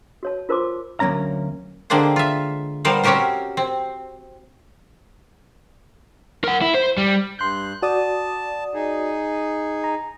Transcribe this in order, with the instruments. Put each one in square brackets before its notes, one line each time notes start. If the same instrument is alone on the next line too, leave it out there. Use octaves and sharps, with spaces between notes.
[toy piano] F#4 C#5 A5
F4 A#4 C5 A5 C6 D6
[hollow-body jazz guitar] D2 F#3 A#3 C#4 A#5
[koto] D3 G#3 A#3 C4 D4 C5
F4 E5
G3 B3 A#4 C5 F5
C4 C#4 F#4 G4 A#4 C5
C4
[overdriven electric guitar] A#4 F#5
E4
C5
G3
[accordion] G2 F#6 [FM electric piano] C6 G6
[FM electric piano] F#4 D5 D#6 [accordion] A5
[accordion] D#4 G#4
[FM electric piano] A#5